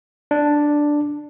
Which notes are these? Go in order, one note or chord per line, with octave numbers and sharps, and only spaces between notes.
D4